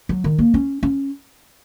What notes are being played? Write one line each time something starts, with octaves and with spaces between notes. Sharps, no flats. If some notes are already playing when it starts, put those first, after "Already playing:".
F#3
D#3
A#3
C#4
C#4